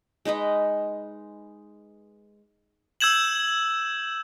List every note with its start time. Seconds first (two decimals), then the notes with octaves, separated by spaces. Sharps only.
0.25 G#3 D#4 B4 D#5
3.01 E6 G6 G#6 E7 F#7